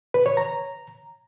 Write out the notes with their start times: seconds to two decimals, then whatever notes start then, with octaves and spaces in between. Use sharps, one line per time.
0.14 B4
0.26 C#5
0.37 A#5